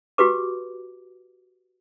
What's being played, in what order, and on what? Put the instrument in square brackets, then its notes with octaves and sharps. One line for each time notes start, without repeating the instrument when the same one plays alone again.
[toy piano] F#4 G4 B4 D6